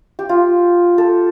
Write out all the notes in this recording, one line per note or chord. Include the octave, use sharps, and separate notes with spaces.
G4
F4
A4